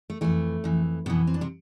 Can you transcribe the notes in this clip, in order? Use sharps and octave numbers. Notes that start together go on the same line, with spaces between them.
A3
F2 E3 A3
F2 E3
F2 B2 E3 B3
C4
D4
C3 C4